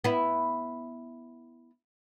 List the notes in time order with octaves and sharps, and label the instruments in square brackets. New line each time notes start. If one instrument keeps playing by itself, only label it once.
[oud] B3 E4